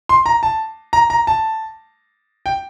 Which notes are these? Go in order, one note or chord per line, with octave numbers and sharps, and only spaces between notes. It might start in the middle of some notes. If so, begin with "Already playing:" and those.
C6
A#5
A5
A#5
A#5
A5
G5